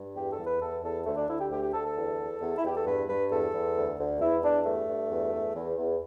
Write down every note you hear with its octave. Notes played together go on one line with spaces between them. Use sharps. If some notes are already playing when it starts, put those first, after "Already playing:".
Already playing: G2
E2 G4
A4
E2
B4
E2 A4
E2 A4
D2 A3
D4
D2 E4
G4
D2 G4
G4
D2 A4
A4
E2
E2
E2
E4
E2 G4
A4
G2 B4
G2 B4
E2 A4
E2
D2
D2
E2 E4
E2 D4
G2 A3
G2
E2
E2
E2
E2